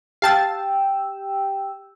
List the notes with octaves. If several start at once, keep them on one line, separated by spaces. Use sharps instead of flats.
G4 F5 G5 A5 E6 A6